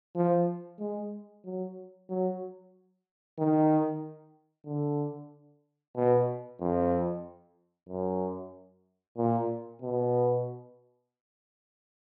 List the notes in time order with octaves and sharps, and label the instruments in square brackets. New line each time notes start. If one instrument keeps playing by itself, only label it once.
[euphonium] F3
G#3
F#3
F#3
D#3
D3
B2
F2
F#2
A#2
B2